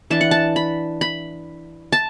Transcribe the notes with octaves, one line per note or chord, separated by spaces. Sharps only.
E3 D4 A5
F#5
A5
B5
B5
A5